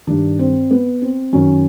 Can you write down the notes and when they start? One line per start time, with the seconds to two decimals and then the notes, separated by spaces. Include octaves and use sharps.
0.07 G2 D#3 D4
0.39 C4
0.71 B3
1.02 C4
1.33 F#2 D#3 C#4